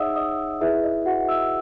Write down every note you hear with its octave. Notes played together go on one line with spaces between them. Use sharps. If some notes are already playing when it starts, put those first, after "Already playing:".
Already playing: D#4 G#4 C#5 D#5 E5 F#5 D#6 E6
D#5 D#6
E4 G#4 B4 E5
D#5
F#4 F#5
E5 E6